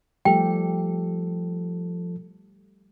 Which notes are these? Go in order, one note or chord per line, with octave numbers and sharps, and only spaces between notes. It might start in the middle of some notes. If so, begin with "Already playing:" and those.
F3 G3 A3 G4 A4 G5